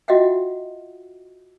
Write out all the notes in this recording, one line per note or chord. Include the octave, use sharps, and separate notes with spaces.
F4 F#4 D#5 E5 F#5 G5